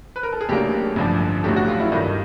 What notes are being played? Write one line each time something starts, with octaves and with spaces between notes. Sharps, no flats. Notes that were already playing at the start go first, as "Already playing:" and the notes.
B4
A#4
A4
G#4
A1 A2 F#3 A#3 D4 G4
A1 G2 D3 F3
A1 A2 F#3 A3 G4
F#4
F4
E4
G2 D#3 G3 D#4